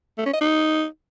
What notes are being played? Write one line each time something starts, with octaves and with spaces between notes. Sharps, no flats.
A3
C#4
D#5
D#4